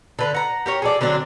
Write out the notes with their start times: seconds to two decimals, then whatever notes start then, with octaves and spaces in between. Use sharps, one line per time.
0.19 D3 B4
0.35 F#5 A#5
0.66 G4 A#4 C#5
0.82 G#4 A4 D5
1.01 D3 F#3 C4 D4